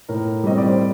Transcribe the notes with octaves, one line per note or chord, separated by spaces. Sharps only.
A2 A#4
G3 C4 D#5
D5
C5